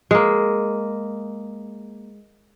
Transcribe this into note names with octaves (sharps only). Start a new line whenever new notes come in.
G#3 A#3